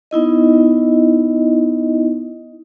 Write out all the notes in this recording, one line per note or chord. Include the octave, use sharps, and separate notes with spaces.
B3 D#4 E4 D#5